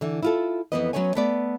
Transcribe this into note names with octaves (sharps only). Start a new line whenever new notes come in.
D3 E3
E4 F4 A4
F2 C#3 E3 B3 B4 D#5
F#3 A3 B3 C#4 C#5 G#5
A3 B3 D5